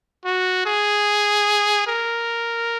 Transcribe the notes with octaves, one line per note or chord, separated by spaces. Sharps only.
F#4
G#4
A#4